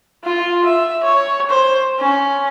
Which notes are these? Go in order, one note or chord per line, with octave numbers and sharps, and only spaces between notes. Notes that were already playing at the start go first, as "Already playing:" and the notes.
F4
E5
C#5
C5
C#4